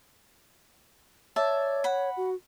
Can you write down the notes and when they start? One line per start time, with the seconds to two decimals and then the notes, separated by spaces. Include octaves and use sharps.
1.36 C#5 D5 E5 A5
1.84 F#5 B5
2.17 F#4